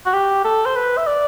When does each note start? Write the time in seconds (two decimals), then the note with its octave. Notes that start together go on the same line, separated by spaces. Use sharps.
0.06 F#4
0.13 G4
0.44 A4
0.66 C5
0.76 B4
0.97 E5
1.06 D5